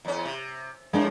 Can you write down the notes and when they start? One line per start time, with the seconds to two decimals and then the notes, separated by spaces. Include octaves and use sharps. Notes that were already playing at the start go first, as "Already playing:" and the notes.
0.05 E2 C#4
0.25 C3
0.93 G#2 G#3 A#3 D4